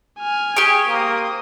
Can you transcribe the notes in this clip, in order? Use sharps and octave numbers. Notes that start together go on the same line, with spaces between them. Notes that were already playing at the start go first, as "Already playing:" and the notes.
G#5 F6
G4 G#4 C#6 D7
A#3 C5 D#6